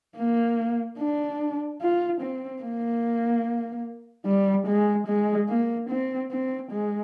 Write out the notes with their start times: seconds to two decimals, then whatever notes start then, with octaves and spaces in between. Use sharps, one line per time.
0.17 A#3
0.98 D4
1.81 F4
2.21 C4
2.63 A#3
4.26 G3
4.67 G#3
5.07 G#3
5.49 A#3
5.89 C4
6.31 C4
6.72 G#3